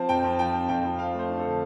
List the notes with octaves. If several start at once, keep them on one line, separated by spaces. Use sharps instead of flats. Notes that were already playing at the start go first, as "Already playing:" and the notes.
Already playing: F3 C4 A5
F2 G5
F2
F3 G5
C4
F2 G5
F2
F3 F5
A3
C5
D4
A4
D3